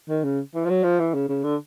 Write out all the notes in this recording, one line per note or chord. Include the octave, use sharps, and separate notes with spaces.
D#3
C#3
E3
F3
F#3
F3
E3
C#3
C#3
D3